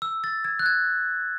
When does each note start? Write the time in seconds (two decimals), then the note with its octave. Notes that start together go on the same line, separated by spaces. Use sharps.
0.02 E6
0.24 A6
0.45 G#6
0.59 F#6
0.66 G#6